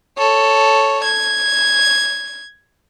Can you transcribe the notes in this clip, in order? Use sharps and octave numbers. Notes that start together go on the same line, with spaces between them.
A4 C#5
G#6